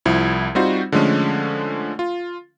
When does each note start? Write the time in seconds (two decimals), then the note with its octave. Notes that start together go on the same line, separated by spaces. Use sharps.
0.05 C2 F3 E4 G#6
0.55 G3 C4 D#4 F4 F#4 C5
0.92 D3 F3 G#3 A3 C#4
1.99 F4